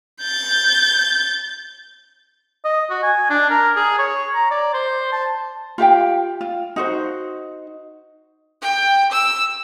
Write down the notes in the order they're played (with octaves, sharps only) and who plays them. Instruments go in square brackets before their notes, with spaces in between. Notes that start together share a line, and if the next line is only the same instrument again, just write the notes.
[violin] G6 A6
[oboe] D#5
F#4
G#5
D4
A#4
G#4
C#5
A#5
D5
C5
A5
[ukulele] F4 G4 F5 G5
F4
D#4 F#4 C5
[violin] G5
E6